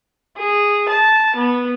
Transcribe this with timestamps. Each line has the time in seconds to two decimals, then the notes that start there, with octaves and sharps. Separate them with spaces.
0.38 G#4
0.89 A5
1.36 B3